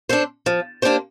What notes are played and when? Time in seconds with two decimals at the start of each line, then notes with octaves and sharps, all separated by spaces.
0.09 D4 A4 C5
0.46 F3
0.82 A#3 D4 G4 C5